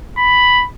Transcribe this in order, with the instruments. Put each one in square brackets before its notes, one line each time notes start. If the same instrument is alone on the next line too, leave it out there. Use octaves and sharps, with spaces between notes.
[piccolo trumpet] B5